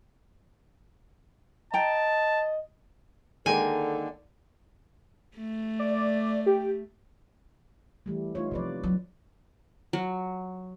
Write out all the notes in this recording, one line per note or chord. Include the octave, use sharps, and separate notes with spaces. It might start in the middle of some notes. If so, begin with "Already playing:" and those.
D#5 G5 A5 A#5
D3 D#3 G#3 A#3 A4 G#5
A3
D5
G4
E3 G3 A3
A3 D#4 F4 C#5
C3 F3 B3 B4 D5
F#3 A3
F#3